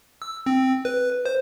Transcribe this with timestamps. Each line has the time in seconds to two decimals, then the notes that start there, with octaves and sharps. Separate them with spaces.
0.22 E6
0.46 C4
0.85 B4
1.26 C5